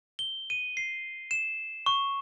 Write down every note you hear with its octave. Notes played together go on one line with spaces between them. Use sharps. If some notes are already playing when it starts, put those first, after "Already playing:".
G7
D#7
C7
E7
C#6